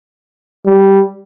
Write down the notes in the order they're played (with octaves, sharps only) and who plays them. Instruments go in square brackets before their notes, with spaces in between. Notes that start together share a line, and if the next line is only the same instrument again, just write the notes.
[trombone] G3